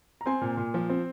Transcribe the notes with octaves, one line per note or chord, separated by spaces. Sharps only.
A#5
C4 G#5 C6
A#2
A#2
F3
C4